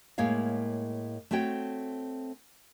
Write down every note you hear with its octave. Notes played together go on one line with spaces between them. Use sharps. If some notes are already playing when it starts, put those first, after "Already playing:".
A2 G#3 A#3 C#5 F5
A3 C4 F#4 C#5 G5